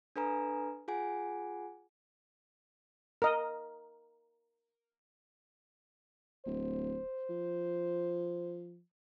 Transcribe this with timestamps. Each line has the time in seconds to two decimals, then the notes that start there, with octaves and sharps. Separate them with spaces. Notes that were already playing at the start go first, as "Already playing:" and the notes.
0.16 D4 A4 B4 G#5 A#5
0.88 F4 G#4 F#5 G#5
3.22 A#4 D#5
6.46 D1 C5
7.30 F3